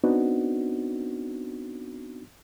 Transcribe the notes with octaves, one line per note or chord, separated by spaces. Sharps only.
B3 C4 D4 D#4 F#4